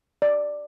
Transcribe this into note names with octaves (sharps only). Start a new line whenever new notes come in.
D5